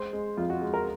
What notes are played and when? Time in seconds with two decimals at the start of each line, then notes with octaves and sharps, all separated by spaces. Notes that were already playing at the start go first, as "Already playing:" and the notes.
Already playing: G#3 C5
0.13 G#3
0.37 F2 F4
0.50 F#4
0.61 G#3
0.74 A#4